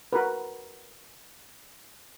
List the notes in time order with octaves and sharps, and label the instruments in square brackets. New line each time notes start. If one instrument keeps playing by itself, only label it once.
[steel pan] F#4 A#4 B4